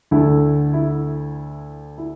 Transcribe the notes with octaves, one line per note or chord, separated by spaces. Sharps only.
D2 D3 A3 E4
E4
E4